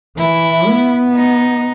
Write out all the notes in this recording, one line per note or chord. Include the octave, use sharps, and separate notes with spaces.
E3 E4
B3
D#4